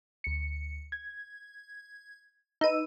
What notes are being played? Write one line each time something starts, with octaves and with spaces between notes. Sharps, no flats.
D2 C#7
G#6
D#4 B4 E6 D#7